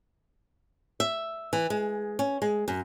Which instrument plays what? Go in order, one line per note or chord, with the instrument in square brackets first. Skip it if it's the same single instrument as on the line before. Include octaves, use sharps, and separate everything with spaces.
[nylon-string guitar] E5
E3
G#3
C#4
G#3
F#2